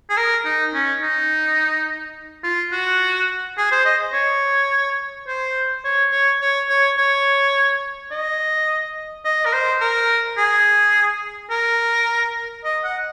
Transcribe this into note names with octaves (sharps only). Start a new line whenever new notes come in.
G#4
A#4
D#4
C#4
D#4
F4
F#4
G#4
C5
D#5
C#5
C5
C#5
C#5
C#5
C#5
C#5
D#5
D#5
A#4
C5
A#4
G#4
A#4
D#5
F#5